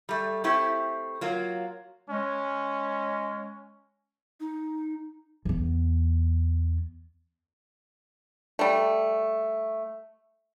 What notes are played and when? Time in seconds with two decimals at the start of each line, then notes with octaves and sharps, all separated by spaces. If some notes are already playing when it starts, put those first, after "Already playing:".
0.09 G3 A3
0.44 A3 C4 E4 G4
1.21 F#3 A#3 F4
2.10 G#3 C#4
4.40 D#4
5.45 E2 B3
8.59 G3 A3